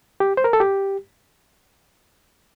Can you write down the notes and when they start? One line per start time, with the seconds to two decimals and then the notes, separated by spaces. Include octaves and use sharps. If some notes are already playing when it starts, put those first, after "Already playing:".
0.20 G4
0.37 C5
0.44 A#4
0.53 A4
0.60 G4